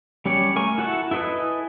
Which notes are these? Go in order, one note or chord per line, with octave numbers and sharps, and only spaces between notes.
G3 C#4 G4 C#5 D5
A3 A#4 G#5 C#6
E4 F#4 A4 F#5 A5
E4 A4 B4 D#5 G#5